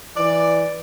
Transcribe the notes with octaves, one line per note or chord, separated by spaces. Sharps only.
E3 D5